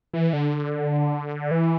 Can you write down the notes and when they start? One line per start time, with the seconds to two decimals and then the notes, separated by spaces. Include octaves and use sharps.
0.14 E3
0.33 D3
1.51 E3